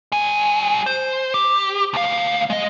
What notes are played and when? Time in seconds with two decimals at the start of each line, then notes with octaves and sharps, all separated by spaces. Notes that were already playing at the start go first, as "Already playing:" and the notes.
0.12 G3 G#5
0.86 C5
1.34 G4
1.94 D2 F5
2.50 G#3 D#5